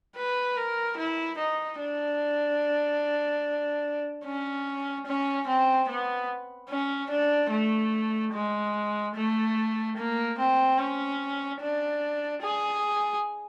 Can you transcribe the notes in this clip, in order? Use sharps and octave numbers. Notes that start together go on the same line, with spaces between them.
B4
A#4
E4
D#4
D4
C#4
C#4
C4
B3
C#4
D4
A3
G#3
A3
A#3
C4
C#4
D4
G#4